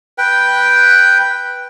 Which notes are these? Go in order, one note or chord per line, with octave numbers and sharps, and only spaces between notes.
B4 G5